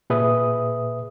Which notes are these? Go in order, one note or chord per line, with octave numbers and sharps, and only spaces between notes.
A#2 G#4 B4 E5 D#6